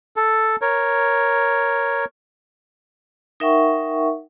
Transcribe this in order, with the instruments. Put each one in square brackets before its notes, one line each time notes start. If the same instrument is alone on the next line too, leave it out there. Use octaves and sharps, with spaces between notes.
[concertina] A4
A#4 C#5
[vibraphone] D#4 A#4 E5 F#5 G5 C#6